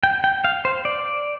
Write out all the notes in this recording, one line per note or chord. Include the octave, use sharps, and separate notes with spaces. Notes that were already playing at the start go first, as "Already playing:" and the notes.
G5
G5
F5
C5
D5